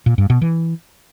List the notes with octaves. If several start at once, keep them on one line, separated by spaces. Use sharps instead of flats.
A#2
G2
B2
E3